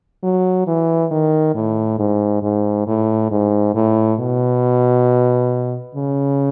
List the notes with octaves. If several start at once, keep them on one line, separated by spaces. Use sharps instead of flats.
F#3
E3
D#3
A2
G#2
G#2
A2
G#2
A2
B2
C#3